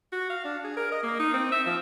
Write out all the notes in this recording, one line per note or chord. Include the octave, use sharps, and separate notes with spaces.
F#4
F5
D4
G#4
A#4
D#5
A#3
D#4
C4
E5
F3